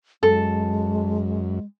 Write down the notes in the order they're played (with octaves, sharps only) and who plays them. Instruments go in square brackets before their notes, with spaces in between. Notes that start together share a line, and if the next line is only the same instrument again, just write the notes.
[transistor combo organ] F#2 [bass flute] G#3 [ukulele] A4